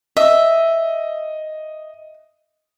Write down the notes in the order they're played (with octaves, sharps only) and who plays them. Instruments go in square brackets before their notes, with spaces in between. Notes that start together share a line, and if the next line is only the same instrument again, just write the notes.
[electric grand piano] D#5 [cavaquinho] E5